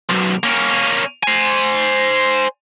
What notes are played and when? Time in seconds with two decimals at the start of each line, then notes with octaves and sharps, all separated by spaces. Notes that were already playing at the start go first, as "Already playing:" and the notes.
0.10 B1 F#2
0.43 A#3 C#4
1.23 C5 G#5